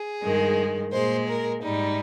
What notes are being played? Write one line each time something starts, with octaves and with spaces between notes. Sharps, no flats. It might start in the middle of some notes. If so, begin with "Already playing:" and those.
Already playing: G#4
G2 D#3 G#3
A#2 G#3 C5
A#4
G#2 G3 D#4